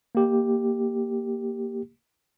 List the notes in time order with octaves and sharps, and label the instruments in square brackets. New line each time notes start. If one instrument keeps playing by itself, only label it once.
[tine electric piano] A#3 G4